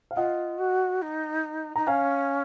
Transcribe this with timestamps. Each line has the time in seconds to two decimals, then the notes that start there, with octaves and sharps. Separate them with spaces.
0.11 F5
0.16 F4 D#5 F#5
0.58 F#4
1.02 D#4
1.76 D#4 A#5
1.87 C#4 F5 G#5